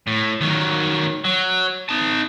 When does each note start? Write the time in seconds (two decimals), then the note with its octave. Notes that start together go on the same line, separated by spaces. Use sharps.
0.07 A2
0.41 D#3 F#3
1.24 F#3
1.89 D#4 A5